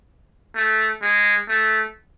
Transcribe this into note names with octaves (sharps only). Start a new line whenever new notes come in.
A3
G#3
A3